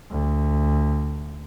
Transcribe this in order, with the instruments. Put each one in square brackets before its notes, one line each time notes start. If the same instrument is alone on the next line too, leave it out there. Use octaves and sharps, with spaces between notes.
[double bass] D2